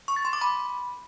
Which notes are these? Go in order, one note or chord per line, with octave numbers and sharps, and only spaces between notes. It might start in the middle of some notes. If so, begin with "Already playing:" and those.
C#6
A6
C6
D6
B5